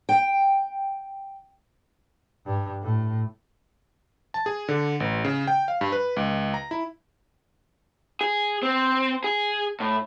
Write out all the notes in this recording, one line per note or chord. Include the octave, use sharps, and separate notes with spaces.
G5
G2
A2
A5
G#4
D3
A1
C#3
G5
F5
G2
B4
C#2
A#5
E4
G#4
C4
G#4
A2